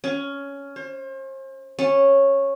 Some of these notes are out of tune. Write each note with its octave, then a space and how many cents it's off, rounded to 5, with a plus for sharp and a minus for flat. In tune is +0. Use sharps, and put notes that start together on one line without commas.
C#4 +10
C5 +40
C#4 -10